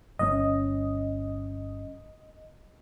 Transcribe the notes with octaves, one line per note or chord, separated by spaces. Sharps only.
G1 C3 C#4 D#5